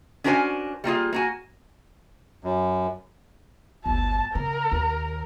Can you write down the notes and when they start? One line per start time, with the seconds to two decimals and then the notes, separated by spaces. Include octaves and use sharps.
0.24 C#4 D4 F#4 A#4 C5 G#5
0.84 G3 A#3 F4 G#4
1.13 A#3 F#4 G#5
2.44 F#2
3.86 G1 D2 A5
4.35 C#3 A#4
4.72 D#2